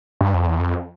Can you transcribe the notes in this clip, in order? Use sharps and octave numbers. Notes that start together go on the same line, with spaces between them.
G2
F2
E2
F2